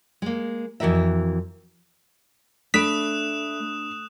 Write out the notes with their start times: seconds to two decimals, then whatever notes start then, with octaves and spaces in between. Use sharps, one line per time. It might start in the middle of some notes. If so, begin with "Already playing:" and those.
0.22 G#3 A#3
0.80 F2 E3 F#4 A#4 E5
2.74 A3 D4 B5 D#6 F#6 B6 D7 E7